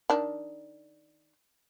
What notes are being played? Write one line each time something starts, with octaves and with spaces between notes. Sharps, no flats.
D#3 D4